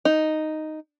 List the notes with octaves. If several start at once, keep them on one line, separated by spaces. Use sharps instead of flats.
D#4